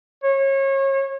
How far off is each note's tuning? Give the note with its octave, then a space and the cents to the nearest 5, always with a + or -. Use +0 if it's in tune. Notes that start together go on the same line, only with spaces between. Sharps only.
C#5 -30